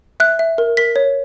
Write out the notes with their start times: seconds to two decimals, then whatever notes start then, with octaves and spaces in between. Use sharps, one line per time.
0.20 E5 F#6
0.39 E5
0.58 A#4
0.77 A#4 B6
0.96 C#5